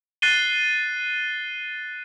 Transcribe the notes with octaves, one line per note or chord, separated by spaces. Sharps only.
F#6 A6 C7 D#7 G7